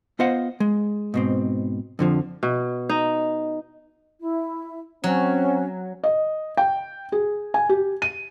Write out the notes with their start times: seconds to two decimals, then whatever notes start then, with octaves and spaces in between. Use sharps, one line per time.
0.19 B3 F4 C5 D#5 F5 F#5
0.60 G#3
1.14 G#2 B2 C4
1.99 F2 D3 F3
2.43 B2
2.89 D#4
4.20 E4
5.04 F#3 C4 C#4
6.04 D#5
6.57 G5
7.12 G#4
7.54 G#5
7.69 G4
8.02 D#7